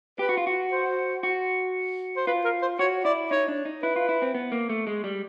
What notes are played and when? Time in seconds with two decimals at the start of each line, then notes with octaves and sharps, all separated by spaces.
0.19 G4 B4
0.29 F#4
0.37 F4
0.47 F#4
0.72 C5
1.23 F#4
2.16 C5
2.27 F4 B4
2.45 A#4
2.62 C5
2.79 F#4 C#5
3.05 E4 D5
3.31 D#4 C#5
3.48 D4
3.65 D#4
3.83 E4 B4
3.96 F4
4.09 E4
4.22 C4
4.35 B3
4.52 A#3
4.69 A3
4.87 G#3
5.04 G3